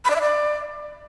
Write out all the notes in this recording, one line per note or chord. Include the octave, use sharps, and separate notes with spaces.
B5
D5
E5
D5